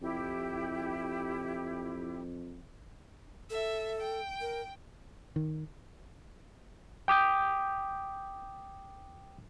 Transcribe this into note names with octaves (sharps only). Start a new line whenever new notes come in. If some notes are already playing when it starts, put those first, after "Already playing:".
F2 E4 G4
A4 E5
G5
A#4
D#3
G5 D6 D#6 G6